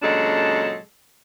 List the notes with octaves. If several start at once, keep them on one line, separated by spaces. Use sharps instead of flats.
A#2 C#3 F#3 G#3 D4 A4